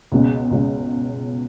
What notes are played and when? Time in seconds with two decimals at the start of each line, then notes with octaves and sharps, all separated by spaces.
0.12 C#2 B2 G#3
0.51 C#2 B2 G#3